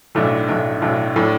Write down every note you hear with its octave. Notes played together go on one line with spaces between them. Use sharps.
B1 A2 A3 D4
B1 A2 A3 D4
B1 A2 A3 D4
A2 A3 D4